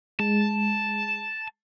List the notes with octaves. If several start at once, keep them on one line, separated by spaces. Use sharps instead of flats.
G#3 A5